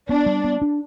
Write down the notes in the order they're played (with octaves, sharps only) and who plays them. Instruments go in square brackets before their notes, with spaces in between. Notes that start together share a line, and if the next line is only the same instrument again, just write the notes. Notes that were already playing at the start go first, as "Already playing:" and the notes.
[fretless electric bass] B3 [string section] D4
[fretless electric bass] G3
B3
D4